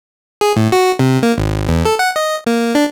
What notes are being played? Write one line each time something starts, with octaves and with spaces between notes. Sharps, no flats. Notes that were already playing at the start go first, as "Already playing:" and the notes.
G#4
A2
F#4
C3
A#3
G#1
E2
A4
F#5
D#5
A#3
D4